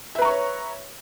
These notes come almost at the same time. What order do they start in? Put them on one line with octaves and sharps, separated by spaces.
E5 B4 A#5 C#6 C#5